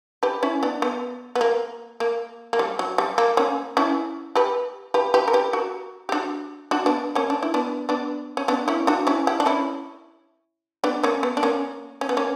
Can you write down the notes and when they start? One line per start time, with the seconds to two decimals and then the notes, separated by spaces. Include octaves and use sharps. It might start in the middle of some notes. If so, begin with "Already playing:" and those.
0.23 G4 B4
0.43 C#4 E4
0.63 B3 D4
0.82 B3
1.35 B3
1.41 A#3
2.00 A#3
2.53 A#3
2.59 G3
2.79 F#3
2.98 G3
3.18 A#3
3.37 A#3 C#4
3.77 C#4 E4
4.35 G4 B4
4.94 G4 B4
5.14 G4 B4
5.28 A#4
5.33 G4 B4
5.53 F#4 A#4
6.09 G4
6.12 D4 F#4
6.71 D4 F#4
6.86 B3 D4
7.15 A#3 C#4
7.30 D4
7.43 E4
7.54 B3 D4
7.89 B3 D4
8.37 C#4
8.48 B3 D4
8.68 C#4 E4
8.87 D4 F#4
9.07 C#4 E4
9.27 E4 G4
9.40 D4
9.46 C#4 E4
10.84 B3 D4
11.03 A#3 C#4
11.23 B3
11.37 D4
11.43 A#3 C#4
12.01 C#4
12.09 B3
12.17 A#3 C#4